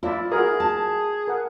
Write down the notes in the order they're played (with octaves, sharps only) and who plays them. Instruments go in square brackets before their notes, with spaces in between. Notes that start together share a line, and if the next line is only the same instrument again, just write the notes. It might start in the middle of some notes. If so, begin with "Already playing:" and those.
[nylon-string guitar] E4 [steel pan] F4 D5 E5
[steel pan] F#4 A#4 [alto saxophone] G#4
[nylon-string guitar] A5
[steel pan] A#4 F#5